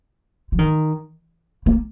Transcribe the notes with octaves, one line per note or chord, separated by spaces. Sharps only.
F3
D#3
A#3